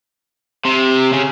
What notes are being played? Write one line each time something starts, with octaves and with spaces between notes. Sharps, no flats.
C3
C#3